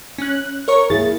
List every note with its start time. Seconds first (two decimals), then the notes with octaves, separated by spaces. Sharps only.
0.18 C#4 F#6
0.68 A#4 C#5 C#6
0.90 A#3 E4 G#4 A6